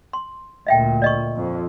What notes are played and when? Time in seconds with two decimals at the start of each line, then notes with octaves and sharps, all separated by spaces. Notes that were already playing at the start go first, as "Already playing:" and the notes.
0.13 C6
0.67 D2 A#2 D#5 E5 G5
1.02 D5 D#5 C#6
1.35 F2